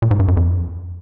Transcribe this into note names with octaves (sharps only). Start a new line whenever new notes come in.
A#2
G#2
G2
F#2
F2